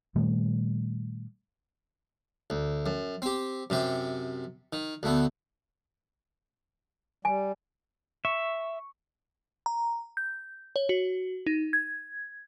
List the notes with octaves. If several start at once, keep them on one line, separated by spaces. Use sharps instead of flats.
A#2 D#3 G3 A3
D2
F#2
C4 G4
F#2 C3 G5
D#3
D2 A3 B3
G3 G#5
E5 C#6
A#5
G6
C#5
F#4
D#4
G#6